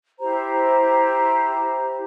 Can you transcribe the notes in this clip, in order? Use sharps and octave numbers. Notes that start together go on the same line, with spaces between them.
E4 G4 C5 A#5